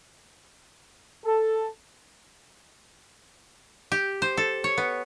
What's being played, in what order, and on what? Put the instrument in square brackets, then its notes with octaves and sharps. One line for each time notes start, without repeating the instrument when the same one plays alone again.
[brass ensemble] A4
[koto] G4
C5
A4
C#5
B3